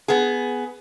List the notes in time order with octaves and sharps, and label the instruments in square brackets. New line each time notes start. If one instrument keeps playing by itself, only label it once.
[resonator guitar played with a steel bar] B3 G#4